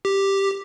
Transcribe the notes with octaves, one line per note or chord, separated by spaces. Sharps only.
G4